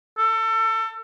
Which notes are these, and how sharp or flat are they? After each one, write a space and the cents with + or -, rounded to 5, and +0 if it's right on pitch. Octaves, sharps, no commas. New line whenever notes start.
A4 +25